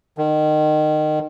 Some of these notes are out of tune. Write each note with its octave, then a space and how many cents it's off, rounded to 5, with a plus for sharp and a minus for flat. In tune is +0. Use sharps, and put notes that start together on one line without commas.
D#3 -25